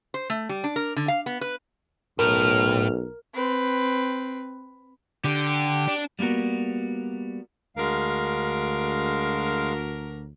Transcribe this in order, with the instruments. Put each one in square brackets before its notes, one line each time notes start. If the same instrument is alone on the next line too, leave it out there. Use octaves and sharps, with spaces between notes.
[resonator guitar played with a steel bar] C5
A3
G3
D4
A#4
D3
F5
B3
B4
[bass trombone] B1 [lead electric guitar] A2 [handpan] A#4 [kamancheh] F6
[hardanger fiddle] C4 B4
[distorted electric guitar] D3 [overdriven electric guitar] G4
[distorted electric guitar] D4
[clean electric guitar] G3 A#3 B3 F#4 A#4
[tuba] D2 [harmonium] G#3 F5 [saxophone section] D4 F#4 A#4